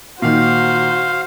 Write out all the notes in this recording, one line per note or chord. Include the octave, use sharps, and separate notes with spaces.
A#2 D#3 F#4 C5 F5